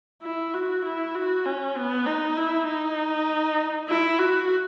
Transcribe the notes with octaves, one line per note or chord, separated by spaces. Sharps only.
E4
F#4
E4
F#4
C#4
B3
D#4
E4
D#4
E4
F#4